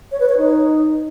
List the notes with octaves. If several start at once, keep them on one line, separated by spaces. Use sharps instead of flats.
C#5
B4
C#5
D#4